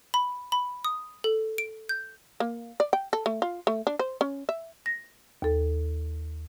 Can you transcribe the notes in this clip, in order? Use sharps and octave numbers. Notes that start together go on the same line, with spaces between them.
B5
B5
D#6
A4
D7
G6
A#3
D5
G5
A4
A3
F4
A3
D4
C5
C#4
E5
A#6
D#2 A4